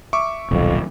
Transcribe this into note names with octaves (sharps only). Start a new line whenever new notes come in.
E5 C#6 D6
D#1 B1 F2